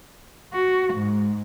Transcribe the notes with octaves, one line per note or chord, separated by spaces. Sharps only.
F#4
G#2